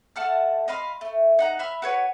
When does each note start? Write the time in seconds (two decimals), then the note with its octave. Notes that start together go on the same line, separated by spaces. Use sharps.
0.16 A3 F#5 A5 F6
0.68 D#5 F5 B5 C6
1.01 A3
1.39 D#4 F#5 A#5
1.59 E5 B5 E6 F6
1.82 F#4 B4 C#5